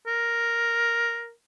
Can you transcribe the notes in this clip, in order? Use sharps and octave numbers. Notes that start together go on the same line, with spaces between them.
A#4